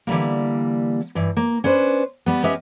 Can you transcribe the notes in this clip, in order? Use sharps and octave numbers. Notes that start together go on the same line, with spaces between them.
D3 E3 G3 A#3
G2 E3
A#3
C#4 D4 B4 C5
G3 B3
C#4 G4 B4 D#5 E5